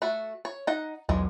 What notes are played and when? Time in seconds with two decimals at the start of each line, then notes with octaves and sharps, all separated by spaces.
0.02 A3 F#4
0.45 C#5
0.67 D#4 F#5
1.09 B1 E2 F#3 G#3